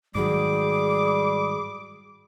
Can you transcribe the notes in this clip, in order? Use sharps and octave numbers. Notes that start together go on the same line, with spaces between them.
G#2 D#3 F#3 G3 G#4 D6